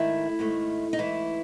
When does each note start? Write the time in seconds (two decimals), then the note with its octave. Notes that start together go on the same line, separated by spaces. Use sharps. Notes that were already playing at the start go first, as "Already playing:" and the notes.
Already playing: G#2 D#3 A3 E4
0.39 G#2 D#3 A3
0.93 D#4
0.98 G#2 E3 A3 E4